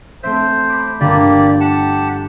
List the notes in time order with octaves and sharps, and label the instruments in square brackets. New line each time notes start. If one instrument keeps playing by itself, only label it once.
[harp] A3 C4 E5 [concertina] C5
[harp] B5 D6
[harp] G1 D3 [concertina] A#3 G4 D5
[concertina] G4 F#5 A5